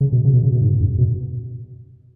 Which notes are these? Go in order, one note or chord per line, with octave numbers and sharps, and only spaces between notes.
C#3
B2
C#3
B2
C#3
B2
G#2
F#2
B2